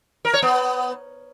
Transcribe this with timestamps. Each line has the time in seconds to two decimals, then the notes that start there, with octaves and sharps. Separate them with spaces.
0.25 A#4
0.34 C#5
0.42 B3